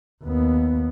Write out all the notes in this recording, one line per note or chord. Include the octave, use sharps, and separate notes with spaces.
D#2 B3